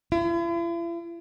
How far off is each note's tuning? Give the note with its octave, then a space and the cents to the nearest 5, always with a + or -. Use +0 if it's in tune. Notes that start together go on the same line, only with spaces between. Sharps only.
E4 +45